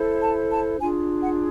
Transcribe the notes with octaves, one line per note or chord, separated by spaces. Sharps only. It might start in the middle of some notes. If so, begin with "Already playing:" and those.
Already playing: E4 A4 C5
A5
A5
D4 F4 G#4 G#5
F#5